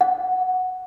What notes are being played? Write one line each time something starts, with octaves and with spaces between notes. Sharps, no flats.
F#5